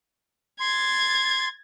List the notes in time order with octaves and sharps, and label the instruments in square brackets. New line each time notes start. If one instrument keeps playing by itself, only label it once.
[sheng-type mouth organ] C6 [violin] G#6 A6